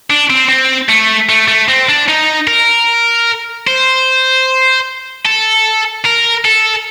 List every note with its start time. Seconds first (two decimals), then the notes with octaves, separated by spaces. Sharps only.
0.10 D4
0.30 C4
0.49 C4
0.89 A3
1.29 A3
1.48 A3
1.69 C4
1.89 D4
2.08 D#4
2.47 A#4
3.67 C5
5.25 A4
6.05 A#4
6.45 A4